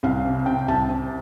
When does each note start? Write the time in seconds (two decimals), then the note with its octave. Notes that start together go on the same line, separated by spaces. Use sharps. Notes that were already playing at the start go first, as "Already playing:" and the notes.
0.03 C2 F5
0.25 C3
0.46 C3 G5
0.68 C2 A5
0.89 C3